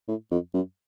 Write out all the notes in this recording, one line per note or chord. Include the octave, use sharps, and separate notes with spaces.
A2
F2
F#2